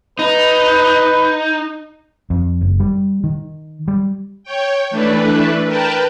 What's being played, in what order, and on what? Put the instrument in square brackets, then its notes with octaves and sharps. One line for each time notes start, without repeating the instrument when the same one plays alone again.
[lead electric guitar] D#4 [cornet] B4
[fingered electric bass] F2
F#1
G3
D#3
G3
[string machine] C#5 G5
E3 A3 D4 B4
A#4 B4 G5 A5